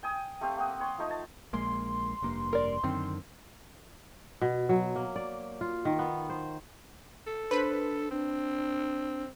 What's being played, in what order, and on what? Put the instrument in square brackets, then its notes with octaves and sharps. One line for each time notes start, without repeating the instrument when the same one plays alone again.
[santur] G5 G#5 D#6
A3 C4 G4 F5
A#3 F#5 D#6
C#5 C6
F3 A3 D#4
A5
[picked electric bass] A#1 G#3 A#3 [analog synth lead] C6
[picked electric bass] F1 G2 A#3
[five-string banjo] A#4 D5
[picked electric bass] F#2 D3 D#3 [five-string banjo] C4
[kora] B2
F#3
A#3
D5
F4
D#3
B3
C5
[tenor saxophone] A4
[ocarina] D4 [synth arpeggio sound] B4 C5 B5
[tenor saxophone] C4 [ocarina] D4